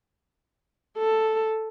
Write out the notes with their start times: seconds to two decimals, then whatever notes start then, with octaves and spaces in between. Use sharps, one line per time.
0.98 A4